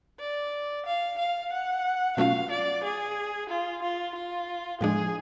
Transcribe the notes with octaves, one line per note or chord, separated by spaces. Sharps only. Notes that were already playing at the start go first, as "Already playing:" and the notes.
D5
F5
F5
F#5
B2 F#3 A3 C#4 F4 F5
D5
G#4
F4
F4
F4
A2 F3 G#3 D4 G#4